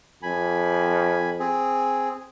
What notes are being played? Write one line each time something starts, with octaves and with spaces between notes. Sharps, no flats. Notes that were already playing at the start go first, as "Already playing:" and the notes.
F2 G#5 B5
C4 G#4